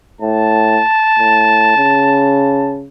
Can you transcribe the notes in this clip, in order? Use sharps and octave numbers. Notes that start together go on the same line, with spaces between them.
A2 A5
A2
C#3